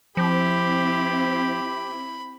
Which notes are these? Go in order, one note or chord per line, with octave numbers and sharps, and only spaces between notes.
F3 C4 E4 G4 B5